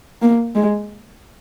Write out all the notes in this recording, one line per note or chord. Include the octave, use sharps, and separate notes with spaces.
A#3
G#3